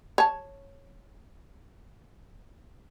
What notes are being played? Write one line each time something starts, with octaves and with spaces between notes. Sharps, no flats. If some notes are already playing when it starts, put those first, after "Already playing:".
C#5 A5